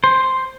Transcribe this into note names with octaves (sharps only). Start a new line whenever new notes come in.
C5